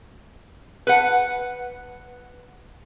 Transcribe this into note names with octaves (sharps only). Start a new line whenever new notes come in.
B4 F#5